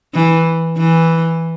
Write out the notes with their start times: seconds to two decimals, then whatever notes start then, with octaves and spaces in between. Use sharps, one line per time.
0.14 E3
0.78 E3